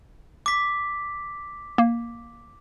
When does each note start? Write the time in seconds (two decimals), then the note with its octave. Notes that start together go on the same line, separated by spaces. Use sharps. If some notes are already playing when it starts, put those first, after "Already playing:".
0.46 D6 B6
1.78 A#3